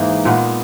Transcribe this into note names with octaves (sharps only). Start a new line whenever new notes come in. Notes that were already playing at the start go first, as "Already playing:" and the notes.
Already playing: G#2 E3 A#3 D#4
A#2 G#3 B3